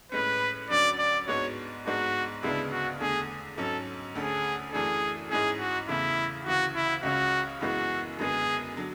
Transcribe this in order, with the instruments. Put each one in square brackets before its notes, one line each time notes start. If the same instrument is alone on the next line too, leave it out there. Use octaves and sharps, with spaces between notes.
[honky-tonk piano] A2 G#3 C#4 [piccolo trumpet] B4
[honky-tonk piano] D2 D3 F#3 C#4 [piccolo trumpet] D5
[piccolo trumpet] D5
[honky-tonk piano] G#2 G#3 B3 D4 F#4 [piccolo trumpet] C#5
[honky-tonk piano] G#2 G#3 B3 D4 [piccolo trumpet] F#4
[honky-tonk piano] D2 C#3 G#3 B3 D4 [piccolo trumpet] E4
[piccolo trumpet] F#4
[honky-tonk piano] E2 D3 A3 [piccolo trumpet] G#4
[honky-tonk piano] G#2 F#3 C#4 [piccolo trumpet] A4
[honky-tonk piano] D2 D3 A3 C#4 [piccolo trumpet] G#4
[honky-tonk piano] F#2 E3 A3 D4 [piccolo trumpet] G#4
[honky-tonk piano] G#2 G#3 C#4 E4 [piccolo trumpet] G#4
[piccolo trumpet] F#4
[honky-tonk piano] E2 C#3 E3 A3 [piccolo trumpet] E4
[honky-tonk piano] D2 C#3 E3 [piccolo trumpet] F#4
[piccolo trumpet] E4
[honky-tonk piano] C#2 C#3 G#3 C#4 [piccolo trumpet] F#4
[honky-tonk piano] F#2 E3 G#3 B3 E4 [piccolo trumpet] F#4
[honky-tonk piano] F#2 D3 G#3 B3 [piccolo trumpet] G#4
[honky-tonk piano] D3 F#3